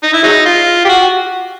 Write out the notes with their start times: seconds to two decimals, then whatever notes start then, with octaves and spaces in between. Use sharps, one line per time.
0.03 D#4
0.13 E4
0.23 F#3 G#3 D#4
0.45 F4
0.85 G4
0.89 F#4